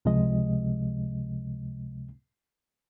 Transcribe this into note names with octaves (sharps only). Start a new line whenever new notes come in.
C#2 C3 F3 G#3 D#5